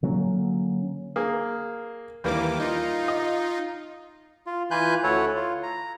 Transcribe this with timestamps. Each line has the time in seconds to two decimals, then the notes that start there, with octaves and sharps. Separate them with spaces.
0.03 D3 F#3 A#3 C#4
1.16 A#3 G#4
2.24 D#2 E3 G3 A#3 D6
2.60 D#4 F4
3.08 D#5
4.47 F4
4.71 E3 F4 B4 G#5 F#6 G6
5.04 D2 E4 A4 C#5 F#5
5.36 F4
5.63 A#5